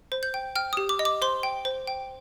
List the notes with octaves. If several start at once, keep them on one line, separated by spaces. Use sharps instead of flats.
C5
G6
G5
G5 F6
G4 D#6
D6
D#5
D6
C5 C6
G5
C5
G5